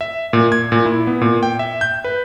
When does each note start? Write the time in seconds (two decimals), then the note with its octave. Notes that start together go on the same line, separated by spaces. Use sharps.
0.01 E5
0.33 A#2
0.52 G#6
0.72 A#2
0.86 E4
1.07 B3
1.21 A#2
1.43 G5
1.59 E5
1.81 G6
2.04 B4